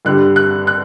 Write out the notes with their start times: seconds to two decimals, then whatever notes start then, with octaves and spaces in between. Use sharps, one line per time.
0.05 G2 D3 G3 F#6
0.36 F#6
0.67 F#6